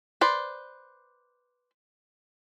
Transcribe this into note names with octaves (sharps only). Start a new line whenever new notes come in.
B4 C5 D5